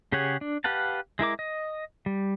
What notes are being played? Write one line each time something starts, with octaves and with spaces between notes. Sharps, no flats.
C#3 G4 G#4 C#5 F#5
D4
G4 B4 F5 F#5 A5
G#3 E4 A#4 D6
D#5
G3